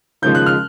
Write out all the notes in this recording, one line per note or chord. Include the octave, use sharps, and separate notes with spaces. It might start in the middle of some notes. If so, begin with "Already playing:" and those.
D#2 C#3 F3 G#3 G6
F#6
F6